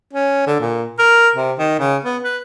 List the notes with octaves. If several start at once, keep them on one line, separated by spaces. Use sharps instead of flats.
C#4
D3
A#2
A#4
C3
D#3
C#3
B3
B4